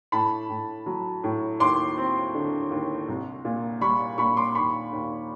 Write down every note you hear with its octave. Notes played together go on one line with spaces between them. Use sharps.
A2 A5 B5
A2
F#3
A2
D#2 C6 D6
C4
D3
D#2
C2
A#2
G3 B5 C#6
A#2 B5 C#6
C6 D6
D#2 B5 C#6
D#2